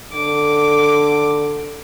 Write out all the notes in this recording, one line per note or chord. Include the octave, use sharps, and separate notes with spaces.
D3 D6